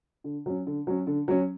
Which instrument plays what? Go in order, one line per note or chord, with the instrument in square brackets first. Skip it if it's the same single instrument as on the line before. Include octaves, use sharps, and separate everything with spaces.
[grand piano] D3
F#3 C#4
D3
F#3 C#4
D3
F#3 C#4